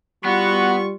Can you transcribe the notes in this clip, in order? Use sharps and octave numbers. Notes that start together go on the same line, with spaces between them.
G3 B3 F4 F#4 C#6